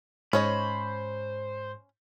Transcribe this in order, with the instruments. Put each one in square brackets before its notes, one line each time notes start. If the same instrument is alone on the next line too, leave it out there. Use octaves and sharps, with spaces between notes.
[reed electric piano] G#2 [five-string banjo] C#4 C#5 D#5 [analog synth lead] C5 [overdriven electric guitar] B5